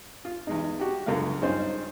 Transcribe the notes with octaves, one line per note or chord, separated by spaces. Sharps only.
F4
E2 G#3 D#4
F#4 G4
C#2 F#2 D3 G#3 F5
G2 C#4 D#4 F4 G#4 C5